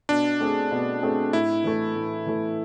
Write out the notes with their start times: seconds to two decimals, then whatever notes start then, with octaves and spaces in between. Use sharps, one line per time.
0.09 B2 D4
0.40 A3 C4 G#4
0.72 B2
1.03 A3 C4 G#4
1.33 A2 E4
1.64 E3 A3
1.96 A2
2.27 E3 A3